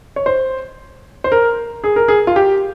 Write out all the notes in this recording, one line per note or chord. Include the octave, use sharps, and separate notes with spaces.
C#5
C5
C5
A#4
G#4
A#4
G#4
F4
G4